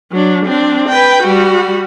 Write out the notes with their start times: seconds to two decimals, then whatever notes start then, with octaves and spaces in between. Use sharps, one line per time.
0.12 F#3 D4
0.46 C4 D4
0.89 B4 G5
1.23 G3 F#4